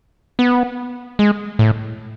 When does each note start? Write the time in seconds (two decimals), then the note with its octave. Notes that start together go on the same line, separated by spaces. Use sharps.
0.39 B3
1.19 G#3
1.59 A2